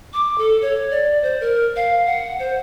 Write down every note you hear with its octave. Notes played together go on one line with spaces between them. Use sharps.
D6
A4
C#5
D5
C5
A#4
F5
F#5
C5